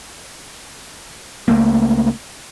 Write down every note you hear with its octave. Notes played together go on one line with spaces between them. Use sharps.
C#2 A3 A#3